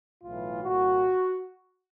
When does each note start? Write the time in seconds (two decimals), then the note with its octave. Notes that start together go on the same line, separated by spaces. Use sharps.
0.22 B1 A2 E3 F4
0.63 C2 A#2 F#4